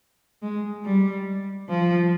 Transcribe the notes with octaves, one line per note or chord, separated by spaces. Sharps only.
G#3
G3
F3